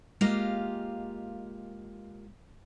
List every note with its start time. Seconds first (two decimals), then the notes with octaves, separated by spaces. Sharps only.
0.21 G#3 A#3 F4 G4 D#5 F5